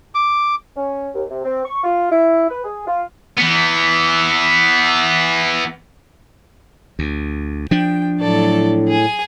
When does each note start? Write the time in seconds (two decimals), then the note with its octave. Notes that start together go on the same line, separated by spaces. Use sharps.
0.15 D6
0.76 C#4
1.14 D#2
1.29 C3
1.44 C4
1.64 C#6
1.83 F4
2.11 E4
2.49 B4
2.64 G#4
2.86 F4
3.37 E3 B3
6.99 D2
7.71 F3 D4 G5
8.19 A2 F#3 A4 D5
8.87 G#4 G#5